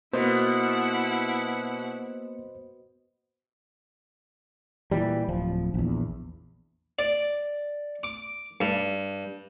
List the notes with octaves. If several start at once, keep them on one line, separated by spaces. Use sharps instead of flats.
B2 A#3 B3 E4 C5 D#5 F#5
A#2 E3 G3
D1 F3
A#1 E2
D5
D6
G2